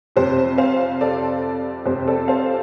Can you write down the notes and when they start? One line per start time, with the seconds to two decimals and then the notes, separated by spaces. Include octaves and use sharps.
0.16 F2 C3 G4 C5
0.58 C5 F5
1.01 A4 D5
1.86 F2 C3 G4 C5
2.08 A4 D5
2.28 C5 F5